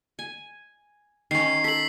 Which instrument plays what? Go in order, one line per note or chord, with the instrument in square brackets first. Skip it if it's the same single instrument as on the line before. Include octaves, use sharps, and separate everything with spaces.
[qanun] G#5
[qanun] D#3 C#4 [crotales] C7
[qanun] A4 [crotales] B6 F#7